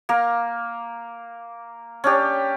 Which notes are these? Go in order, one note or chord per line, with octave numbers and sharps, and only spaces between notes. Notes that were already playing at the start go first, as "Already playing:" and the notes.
A#3 A#4
C#4 D4 G4